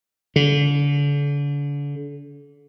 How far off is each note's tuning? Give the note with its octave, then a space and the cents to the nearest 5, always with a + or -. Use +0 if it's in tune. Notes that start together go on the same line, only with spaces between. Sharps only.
D3 -40